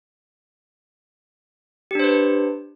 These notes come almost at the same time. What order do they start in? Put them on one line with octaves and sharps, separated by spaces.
G4 D4 C5 B4